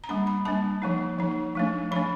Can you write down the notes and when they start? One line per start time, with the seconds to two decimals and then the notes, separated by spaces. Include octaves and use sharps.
0.04 A#5
0.09 G3 A#3 D4 B5
0.27 B5
0.45 G3 A#3 D4 A5
0.82 F3 A#3 D#4
1.18 F3 A#3 D#4
1.55 F3 A3 D4
1.92 F3 A3 D4 B5